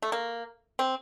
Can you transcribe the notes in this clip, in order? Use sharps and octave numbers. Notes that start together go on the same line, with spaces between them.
A3
A#3
C4